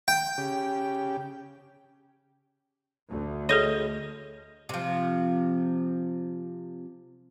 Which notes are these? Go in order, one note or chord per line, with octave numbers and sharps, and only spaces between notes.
G5
C#3 G4
D2
G#4 A4 C#5 D#5
C3 F3